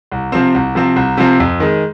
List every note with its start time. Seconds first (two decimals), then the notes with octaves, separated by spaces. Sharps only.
0.12 C2
0.32 C3 F3 C4
0.54 C2
0.75 C3 F3 C4
0.96 C2
1.17 C3 F3 C4
1.40 F2
1.60 D#3 G#3